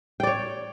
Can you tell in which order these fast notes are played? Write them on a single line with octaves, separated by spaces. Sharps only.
G5 D5 C#5